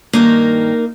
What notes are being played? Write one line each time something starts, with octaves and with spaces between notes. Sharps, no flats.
G2 D#3 A#3 D#4